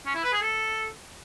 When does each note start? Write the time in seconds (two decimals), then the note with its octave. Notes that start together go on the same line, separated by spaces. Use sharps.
0.06 C#4
0.15 E4
0.24 B4
0.33 G#4
0.42 A4